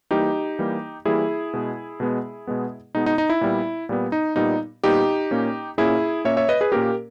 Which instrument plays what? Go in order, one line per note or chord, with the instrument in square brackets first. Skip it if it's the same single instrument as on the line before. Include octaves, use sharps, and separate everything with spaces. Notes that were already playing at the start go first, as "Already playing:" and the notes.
[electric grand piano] E3 G3 A#3 D#4 G4
E3 G3 A#3
E3 G3 A#3 E4 G#4
B2 G#3 B3
B2 G#3 B3
B2 G#3 B3
B2 G#3 B3 D#4
D#4
D#4
E4
A#2 G3 B3
A#2 G3 B3
D#4
A#2 G3 B3 D#4
A#2 G3 B3 D#4 G4
A#2 A#3 C#4
A#2 A#3 C#4 E4 G#4
A#2 A#3 C#4 C#5 E5
C#5 E5
B4 D#5
G#4 B4
A#2 A#3 C#4 G4 A#4